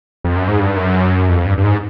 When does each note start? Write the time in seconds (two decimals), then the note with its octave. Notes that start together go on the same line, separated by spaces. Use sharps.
0.24 F2
0.36 F#2
0.48 G#2
0.59 G2
0.76 F#2
1.29 F2
1.46 G2
1.58 G2
1.64 G#2